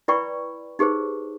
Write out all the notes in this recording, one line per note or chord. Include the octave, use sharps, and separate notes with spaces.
E4 B4 D5 G5 B5 C#6
D#4 G4 G#4 B4 C5